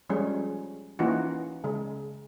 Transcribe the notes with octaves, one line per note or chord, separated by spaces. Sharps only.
F3 G3 G#3 C#4 C#5
E3 A#3 C#4 D#4 F4 F#4
C#3 G#3